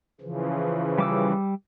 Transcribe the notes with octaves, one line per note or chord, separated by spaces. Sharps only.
C#3 E3 F3
G3 D6 E6